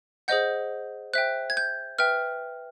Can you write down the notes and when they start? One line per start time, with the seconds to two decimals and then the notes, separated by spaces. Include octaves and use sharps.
0.28 G#4 C5 D#5 F#5 G6
1.13 C5 E5 G5 F#6
1.50 G#6
1.57 G6
1.99 B4 E5 G5 F6